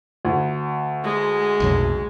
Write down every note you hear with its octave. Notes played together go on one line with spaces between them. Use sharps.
D2
G#3
F1 B1 F#3